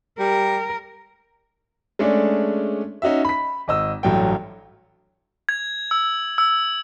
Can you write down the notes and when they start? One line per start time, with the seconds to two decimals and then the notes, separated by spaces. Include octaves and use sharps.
0.20 G3 A#4
1.99 G#3 A3 C#4 D4 G#4 D5
3.02 C#4 D#4 F#4 E5
3.25 B5 B6
3.68 G#1 D#5 E6
4.03 A1 G2 F#3 A3 G5
5.49 G#6
5.91 E6
6.38 E6